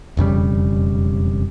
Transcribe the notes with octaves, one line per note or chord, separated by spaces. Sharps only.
E1 F2 C#3 G3